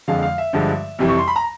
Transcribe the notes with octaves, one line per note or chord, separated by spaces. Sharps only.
F2 D3 F3 G#3 F5
F5
E5
G2 D3 F3 G#3
F2 C3 E3 G3
C#6
C6
B5
A#5